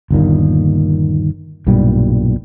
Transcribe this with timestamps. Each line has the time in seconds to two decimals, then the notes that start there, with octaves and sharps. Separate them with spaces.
0.11 G1 D#2 A#2 D#3
1.67 B1 G2 A#2 G3